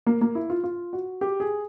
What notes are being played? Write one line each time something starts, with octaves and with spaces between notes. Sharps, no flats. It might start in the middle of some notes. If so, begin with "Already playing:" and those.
A#3
A#3
E4
F4
F4
F#4
G4
G#4